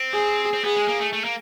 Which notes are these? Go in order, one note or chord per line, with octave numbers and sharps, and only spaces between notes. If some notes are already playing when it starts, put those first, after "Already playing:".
Already playing: C4
G#4
C4
B3 G#4
G#3
A#3
A3
A3
A#3